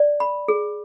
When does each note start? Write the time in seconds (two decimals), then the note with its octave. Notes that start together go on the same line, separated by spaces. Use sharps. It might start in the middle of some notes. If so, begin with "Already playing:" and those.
Already playing: D5
0.20 B5
0.48 G#4